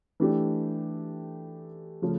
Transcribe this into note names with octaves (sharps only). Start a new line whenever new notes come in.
E3 A3 D4 G4
C#3 F3 A3 C#4